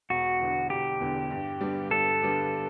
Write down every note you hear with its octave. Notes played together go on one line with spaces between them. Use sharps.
E1 F#4
E2 D3
E1 G4
E2 D3
G2
D3 G3 B3 D4
G2 A4
D3 G3 B3 D4